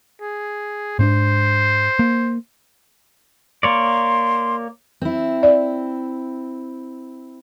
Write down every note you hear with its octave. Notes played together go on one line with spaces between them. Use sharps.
G#4
G#2 C#4 D4 C5
A#3
A#3 C#5 D5 C6
C4 E4
D5